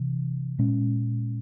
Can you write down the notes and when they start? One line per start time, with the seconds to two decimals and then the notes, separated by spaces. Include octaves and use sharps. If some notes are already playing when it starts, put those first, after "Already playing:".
Already playing: C3 E3
0.59 A#2 G#3 C#4